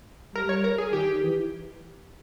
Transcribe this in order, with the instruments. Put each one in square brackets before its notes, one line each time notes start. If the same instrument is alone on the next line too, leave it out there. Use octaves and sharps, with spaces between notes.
[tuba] G3 [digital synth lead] A#4
[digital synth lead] C#5
A#4
G#4
[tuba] D#3 [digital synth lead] G4
[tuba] E3